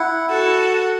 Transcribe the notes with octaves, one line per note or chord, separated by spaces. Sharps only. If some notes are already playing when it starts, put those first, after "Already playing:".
Already playing: E4 F#5
F#4 A4 F#5
F#5